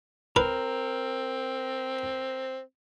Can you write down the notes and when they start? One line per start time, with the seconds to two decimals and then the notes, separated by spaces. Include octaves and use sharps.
0.36 C4 A#4 B4